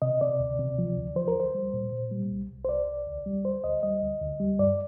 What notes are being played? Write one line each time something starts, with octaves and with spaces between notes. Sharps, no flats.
C3 D#5
C3 D5
D2
C3
F3
D2
F3 C5
A#4
D2 C5
G3
A#2
A#2
G3
C2
C2
C5
C2 D5
C2
D2
G3
D2 C5
D2 D#5
G3 D#5
D2
D2
G3
G2 D5